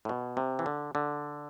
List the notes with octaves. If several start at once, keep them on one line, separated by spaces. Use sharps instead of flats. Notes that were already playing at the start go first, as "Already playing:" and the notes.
A2
B2
C3
E3
D3
D3